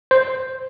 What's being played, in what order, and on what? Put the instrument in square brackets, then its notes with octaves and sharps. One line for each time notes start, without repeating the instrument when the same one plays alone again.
[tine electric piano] C5